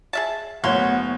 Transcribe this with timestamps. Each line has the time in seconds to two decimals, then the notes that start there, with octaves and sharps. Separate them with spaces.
0.13 G#4 E5 A5
0.64 F#1 A3 B3 C#5 F#5 C6